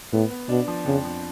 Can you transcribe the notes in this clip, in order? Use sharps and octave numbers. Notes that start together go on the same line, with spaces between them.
A2 B3
B3
B2 D4
F3
F2 C#3
F3